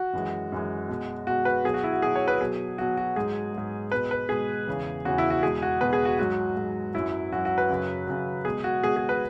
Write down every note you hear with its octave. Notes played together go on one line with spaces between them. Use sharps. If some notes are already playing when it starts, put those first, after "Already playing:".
Already playing: F#4
F#2 E3 G#3
F#2 E3 G#3
B2 G#3
B2 G#3 F#4
B4
B2 F#3 G#4
F#4
E4
F#4
B2 F#3 G#4
C#5
B4
B2 F#3 G#4
B2 F#3 F#4
F#4
G#2 F#3 G#4
G#2 F#3
B2 G#3 B4
B4
B2 G#3 G#4
E2 C#3 E3
E2 C#3 E3 F#4
E4
F#4
E2 B2 G#3 G#4
F#4
E2 B2 G#3 B4
G#4
F#4
G#2 F#3 F#4
G#2 F#3
F#2 F#3 E4
F#2 F#3 F#4
F#4
B4
F#2 C#3 F#3
F#2 C#3 F#3
B2 G#3 G#4
F#4
B2 G#3 G#4
G#4
B4